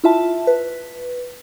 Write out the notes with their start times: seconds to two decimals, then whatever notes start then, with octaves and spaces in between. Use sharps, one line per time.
0.04 E4 F4 E5 A5
0.47 B4